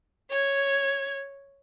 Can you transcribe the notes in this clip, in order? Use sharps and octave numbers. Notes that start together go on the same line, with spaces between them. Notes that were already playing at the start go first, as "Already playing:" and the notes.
C#5 G#6